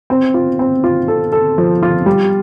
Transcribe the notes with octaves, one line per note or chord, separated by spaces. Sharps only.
C4
F4
C4
F4
A4
A4
F3
F4
G3